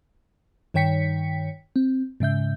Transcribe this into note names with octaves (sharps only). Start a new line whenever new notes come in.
G2 D#3 C#5 G5 B6 C#7
C4
G#2 C#3 E5 G6